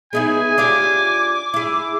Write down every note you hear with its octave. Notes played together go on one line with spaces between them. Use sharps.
B3 D#4 E4 G#4 G#5
D4 F4 G4 D6
E4 G#4